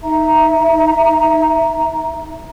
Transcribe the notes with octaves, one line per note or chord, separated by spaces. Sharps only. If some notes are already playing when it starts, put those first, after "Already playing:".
D#4 E5 A#5